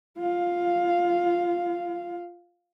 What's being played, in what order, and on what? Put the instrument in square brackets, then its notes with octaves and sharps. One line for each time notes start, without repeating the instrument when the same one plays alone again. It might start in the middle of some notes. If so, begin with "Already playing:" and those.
[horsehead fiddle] F4 F5